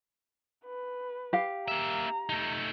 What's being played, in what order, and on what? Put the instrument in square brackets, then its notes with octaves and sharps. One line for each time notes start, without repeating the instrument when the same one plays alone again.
[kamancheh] B4
[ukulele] G4 F5
[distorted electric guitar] A#3 E5 [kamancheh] A#5
[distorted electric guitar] A3 D#4